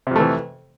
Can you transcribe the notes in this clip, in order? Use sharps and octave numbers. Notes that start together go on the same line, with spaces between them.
F2 C3 E3 A3